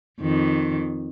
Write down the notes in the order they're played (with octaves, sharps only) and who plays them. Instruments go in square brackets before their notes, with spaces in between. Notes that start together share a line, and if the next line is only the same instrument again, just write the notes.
[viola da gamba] F2 D#3